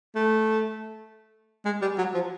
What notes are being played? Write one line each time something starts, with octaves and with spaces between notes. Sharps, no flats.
A3
G#3
G3
F#3
F3